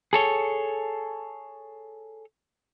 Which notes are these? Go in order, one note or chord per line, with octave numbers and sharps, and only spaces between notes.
G#4 A4 C#5